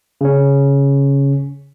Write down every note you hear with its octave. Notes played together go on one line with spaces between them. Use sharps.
C#3 C#4